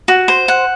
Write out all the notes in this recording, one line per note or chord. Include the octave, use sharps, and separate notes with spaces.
F#4
C5
F#5